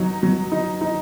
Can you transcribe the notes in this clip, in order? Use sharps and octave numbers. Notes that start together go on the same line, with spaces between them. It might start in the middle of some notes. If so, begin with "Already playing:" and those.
Already playing: F#3 D#4
F#3
D#4
D#4